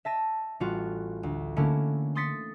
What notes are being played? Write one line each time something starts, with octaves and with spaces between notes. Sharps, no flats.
E5 A5 A#6 D#7
A1 G3 F4 F#4
D2
D3 A3 A#3 C#4 E4
C6 D#6 A6 B6 C#7